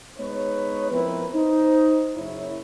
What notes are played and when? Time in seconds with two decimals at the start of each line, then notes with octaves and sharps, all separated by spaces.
0.19 G#3 B3 D#4 B4 C#5
0.91 F3 B3 C4 E4 A#4 B4
1.34 D#4 C5
2.16 F#1 F#2 E4 C#5